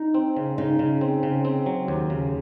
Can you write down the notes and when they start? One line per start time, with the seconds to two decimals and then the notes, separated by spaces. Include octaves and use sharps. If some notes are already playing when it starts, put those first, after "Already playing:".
Already playing: D#4
0.14 C4
0.37 C#3
0.58 C#3 D#4
0.79 C#3
1.01 C4
1.23 C#3
1.45 C4
1.66 F#3
1.88 D#2
2.10 C#3